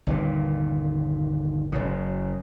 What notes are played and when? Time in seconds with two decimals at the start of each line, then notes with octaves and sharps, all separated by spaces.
0.07 G1 D#2 A#2
1.72 F#1 F#2 C#3